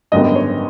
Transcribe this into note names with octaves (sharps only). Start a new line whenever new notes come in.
G#1 F#2 D3 G3 B3 D#5
C#5